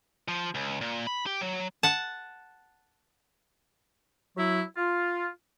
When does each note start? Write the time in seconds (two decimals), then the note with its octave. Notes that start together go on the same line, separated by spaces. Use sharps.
0.28 F3
0.55 C#2
0.81 A#2
1.07 B5
1.26 G4
1.41 F#3
1.83 F#5 A5
4.37 F#3 E4
4.77 F4